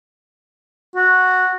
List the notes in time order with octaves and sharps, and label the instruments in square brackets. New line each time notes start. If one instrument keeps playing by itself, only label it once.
[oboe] F#4